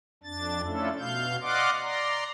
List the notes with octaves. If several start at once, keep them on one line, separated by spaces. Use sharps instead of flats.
F2 D4 A6
A3 C#4 D4 E4 F4 A4
B2 F5 G6
D5 D#5 F5 F#5 C6 D6
D5 A#5 C6